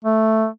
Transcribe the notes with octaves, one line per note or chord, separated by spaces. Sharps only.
A3